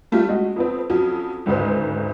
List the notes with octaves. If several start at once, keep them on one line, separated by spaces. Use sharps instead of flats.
G3 A3 C#4 F4 G4
G#3 F#4
F2 B3 C4
F2 F#3 C#4
G#1 D2 G#2 C#3 B4 C5